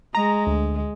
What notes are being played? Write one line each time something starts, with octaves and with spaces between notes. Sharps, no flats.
G#3 A#5
D2